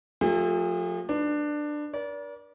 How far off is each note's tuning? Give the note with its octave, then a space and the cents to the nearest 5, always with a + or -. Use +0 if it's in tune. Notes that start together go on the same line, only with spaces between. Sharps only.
F3 +35 A3 +15 G#4 -45
D4 +15 B4 +0
A#4 +45 D5 -30